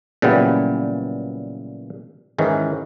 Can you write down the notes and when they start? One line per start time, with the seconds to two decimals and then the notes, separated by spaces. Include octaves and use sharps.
0.22 A#2 C#3 E3 F#3 G3 B3
2.38 G#2 D#3 E3 C#4